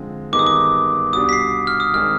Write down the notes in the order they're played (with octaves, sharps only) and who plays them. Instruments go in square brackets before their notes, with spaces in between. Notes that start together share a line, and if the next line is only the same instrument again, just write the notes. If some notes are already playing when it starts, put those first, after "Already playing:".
Already playing: [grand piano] D3 F3 G#3 C4
[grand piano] G2 D#3 B3 D#4 G#4 [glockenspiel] D6
[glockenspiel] D#6
D6
[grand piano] C2 B2 G3 D4 [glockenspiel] D#6
[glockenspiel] B6
C7
F6
D#6
[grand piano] D#3 G#3 C4 [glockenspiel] F6